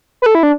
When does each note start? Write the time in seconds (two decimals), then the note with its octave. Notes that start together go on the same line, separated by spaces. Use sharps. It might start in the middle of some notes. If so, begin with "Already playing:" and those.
0.22 B4
0.26 A4
0.35 E4
0.43 D4